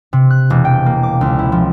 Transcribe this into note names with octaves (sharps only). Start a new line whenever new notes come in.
C3
F#6
E1
G5
A#3
D6
C#2
E4
F3